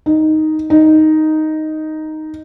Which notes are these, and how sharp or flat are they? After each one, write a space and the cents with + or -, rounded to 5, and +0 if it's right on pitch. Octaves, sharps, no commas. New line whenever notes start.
D#4 +0
D#4 +0